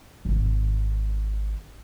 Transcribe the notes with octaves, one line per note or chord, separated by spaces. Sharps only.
D1 G#1